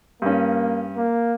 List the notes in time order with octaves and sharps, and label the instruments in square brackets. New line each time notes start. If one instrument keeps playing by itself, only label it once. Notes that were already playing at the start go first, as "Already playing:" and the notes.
[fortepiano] G2 C#4 [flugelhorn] A#3
[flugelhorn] A#3